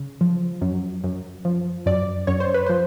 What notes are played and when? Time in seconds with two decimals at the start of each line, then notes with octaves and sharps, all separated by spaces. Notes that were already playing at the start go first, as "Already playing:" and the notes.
Already playing: C#3
0.21 F3
0.61 F#2
1.04 F#2
1.45 F3
1.86 F#2 D5
2.27 F#2 C#5
2.40 C5
2.54 B4
2.66 F3 C5